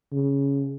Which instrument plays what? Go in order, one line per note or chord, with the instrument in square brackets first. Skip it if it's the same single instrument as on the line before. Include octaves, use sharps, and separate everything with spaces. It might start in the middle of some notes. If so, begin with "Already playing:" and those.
[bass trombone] C#3